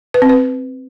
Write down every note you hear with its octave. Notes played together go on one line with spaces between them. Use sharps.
B4
C4
B4